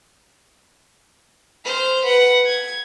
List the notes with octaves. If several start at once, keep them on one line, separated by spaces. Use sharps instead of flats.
C5 F6
B4 F#5
G#6